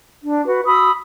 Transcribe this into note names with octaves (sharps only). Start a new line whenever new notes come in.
D4
F#4 B4
F#4 B5 D#6 E6